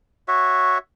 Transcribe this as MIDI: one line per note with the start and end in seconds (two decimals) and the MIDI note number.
0.28 0.78 66
0.28 0.78 73
0.28 0.78 76